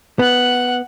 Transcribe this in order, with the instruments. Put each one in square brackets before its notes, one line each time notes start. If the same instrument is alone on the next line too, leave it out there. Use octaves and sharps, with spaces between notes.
[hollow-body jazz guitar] B3 [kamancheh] F#5 F#6